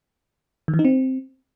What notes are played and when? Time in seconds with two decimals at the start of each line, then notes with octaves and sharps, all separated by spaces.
0.68 D#3
0.74 E3
0.79 D#4
0.85 C4